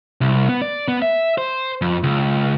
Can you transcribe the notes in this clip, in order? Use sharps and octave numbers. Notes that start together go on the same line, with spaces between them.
C2
B3
D5
B3
E5
C5
F2
C#2